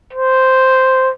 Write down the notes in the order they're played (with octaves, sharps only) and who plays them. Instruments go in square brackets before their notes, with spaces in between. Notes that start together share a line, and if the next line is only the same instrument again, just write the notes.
[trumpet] C5